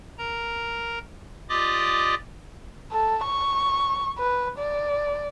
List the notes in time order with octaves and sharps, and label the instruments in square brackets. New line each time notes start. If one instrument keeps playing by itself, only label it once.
[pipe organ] A#4 A#5
F4 G4 D5 D#5 D6 D#6
[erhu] A4
C#6
B4
D5